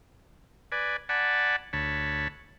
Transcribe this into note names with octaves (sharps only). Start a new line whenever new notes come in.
B4 D5 G#5
D5 F#5 G#5 A5 B5
D2 C#5 A5 B5